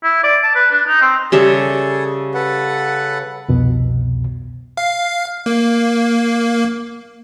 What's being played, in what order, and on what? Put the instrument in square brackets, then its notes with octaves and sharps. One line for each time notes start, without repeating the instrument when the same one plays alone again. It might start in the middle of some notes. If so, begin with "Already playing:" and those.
[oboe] E4
D5
A5
B4
D4
D#4
C4
[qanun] C#3 G3 E5 [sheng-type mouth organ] G#4 A4
[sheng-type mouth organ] A4 B4 F#5
[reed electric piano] C2 F2 B2
[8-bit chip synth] F5
A#3